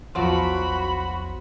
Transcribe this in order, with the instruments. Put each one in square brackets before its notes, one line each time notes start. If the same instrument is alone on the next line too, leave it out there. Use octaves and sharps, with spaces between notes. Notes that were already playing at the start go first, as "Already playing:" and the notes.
[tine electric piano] A#1 E2 C6 [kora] F3 F#3 D5 [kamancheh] F#4 B5